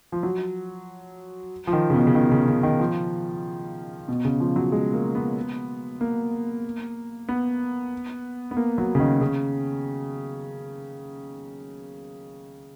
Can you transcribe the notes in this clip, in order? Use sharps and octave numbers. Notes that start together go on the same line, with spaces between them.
F3
F#3
F3
D#3
C#3
B2
C#3
D#3
C#3
C#3
D#3
F3
B2
C#3
F3
F#3
G#3
A#3
B3
A#3
B3
B3
A#3
F#3
C#3
D#3
C#3